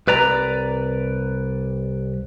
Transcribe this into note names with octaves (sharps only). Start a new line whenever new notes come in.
C2 B4 D5 A#5